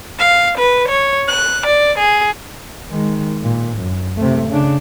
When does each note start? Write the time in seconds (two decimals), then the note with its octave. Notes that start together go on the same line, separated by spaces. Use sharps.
0.18 F5
0.57 B4
0.87 C#5
1.27 F#6
1.66 D5
1.98 G#4
2.90 D#3 G#3
3.43 A#2
3.77 F#2
4.17 C3 A3
4.49 C#3 D4